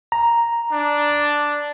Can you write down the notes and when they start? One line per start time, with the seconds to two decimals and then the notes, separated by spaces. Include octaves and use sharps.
0.12 A#5
0.73 D4